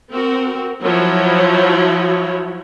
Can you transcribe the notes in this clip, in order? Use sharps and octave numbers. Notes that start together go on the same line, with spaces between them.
C4 F#4 A#4
F3 F#3 E4 F#4 C#5